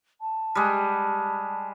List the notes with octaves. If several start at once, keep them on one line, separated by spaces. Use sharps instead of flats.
A5
G3 G#3